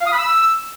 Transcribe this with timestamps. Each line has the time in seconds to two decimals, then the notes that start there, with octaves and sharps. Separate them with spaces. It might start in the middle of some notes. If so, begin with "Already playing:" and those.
0.01 F5
0.07 D#6
0.12 B5
0.18 E6